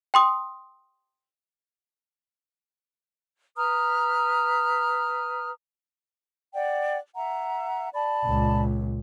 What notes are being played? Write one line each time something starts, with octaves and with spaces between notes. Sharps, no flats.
G5 C6 D#6
B4 A#5 D#6 F6
D5 F#5 G5
E5 F#5 A#5
D5 A5 B5
C#2 A#2